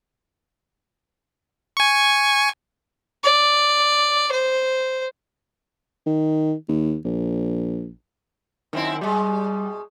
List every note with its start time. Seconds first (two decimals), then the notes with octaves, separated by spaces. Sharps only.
1.77 G#5 C#6
3.23 D5
4.32 C5
6.06 D#3
6.69 D#2
7.05 A#1
8.73 F#2 D#3 C4 E4
9.01 B2 G3 G#3